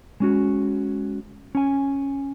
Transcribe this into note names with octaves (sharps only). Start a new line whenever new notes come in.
G#3 C#4 F#4
C#4 G#5